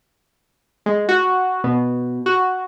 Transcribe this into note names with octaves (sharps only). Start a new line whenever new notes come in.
G#3
F#4
B2
F#4